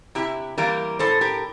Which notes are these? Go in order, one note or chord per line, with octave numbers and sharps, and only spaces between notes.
C3 E4 G4
E3 G3 A#3 G4 A#4
A2 A4 C5
G4 A#4